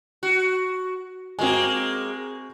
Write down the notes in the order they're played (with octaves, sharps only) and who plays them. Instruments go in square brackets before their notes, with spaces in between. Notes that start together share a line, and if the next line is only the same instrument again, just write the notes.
[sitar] F#4
[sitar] G#3 A#3 [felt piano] C4 F#4 G#5